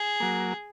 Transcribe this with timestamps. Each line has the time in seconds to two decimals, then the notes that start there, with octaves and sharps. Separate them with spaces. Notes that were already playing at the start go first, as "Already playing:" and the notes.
Already playing: G#4
0.20 F#3 A#3